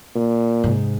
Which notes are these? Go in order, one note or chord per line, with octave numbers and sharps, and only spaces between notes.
A#2
G#2 C3